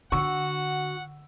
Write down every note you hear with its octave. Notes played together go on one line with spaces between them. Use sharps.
D3 F#4 F#5 C#6 E6